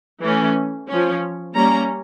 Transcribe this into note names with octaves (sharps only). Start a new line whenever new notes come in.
E3 A3 C#4
F3 C#4
G3 A#3 C#4 A#5